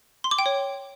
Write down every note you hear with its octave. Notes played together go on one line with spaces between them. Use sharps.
C6
D6
G5
C#5